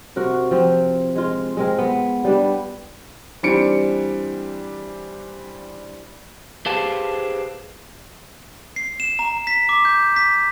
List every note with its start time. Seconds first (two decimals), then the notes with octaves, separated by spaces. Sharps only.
0.16 C3 F#4 A#4
0.51 F3 C4
1.15 G#3 F4
1.57 G#3 C4 A#4
1.78 B3
2.24 G3 B3 D4
3.43 E3 G3 C4 D4 C#7 D7
6.66 G4 G#4 B4 C5 F5 A5
8.76 C7
9.00 E7
9.19 A#5
9.47 B6
9.69 D6
9.85 G6
10.16 B6